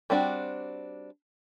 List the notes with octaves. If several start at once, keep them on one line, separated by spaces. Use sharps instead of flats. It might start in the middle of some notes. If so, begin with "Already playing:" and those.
G3 C4 D4 F#4